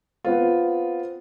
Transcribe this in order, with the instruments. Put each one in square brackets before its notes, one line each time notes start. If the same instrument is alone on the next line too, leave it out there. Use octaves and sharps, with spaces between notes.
[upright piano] B3 C4 F4